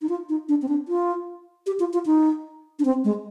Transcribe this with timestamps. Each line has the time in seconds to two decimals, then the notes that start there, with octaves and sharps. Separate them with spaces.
0.02 D#4
0.09 F4
0.29 D#4
0.49 D4
0.62 C4
0.68 D4
0.88 F4
1.66 G4
1.80 F4
1.93 F4
2.06 D#4
2.79 D4
2.85 C4
3.04 G#3